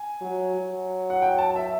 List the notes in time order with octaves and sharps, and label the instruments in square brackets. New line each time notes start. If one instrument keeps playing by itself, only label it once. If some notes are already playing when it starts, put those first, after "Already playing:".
Already playing: [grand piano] G#5
[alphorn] F#3
F#3
[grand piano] F#5
G5
A5
E5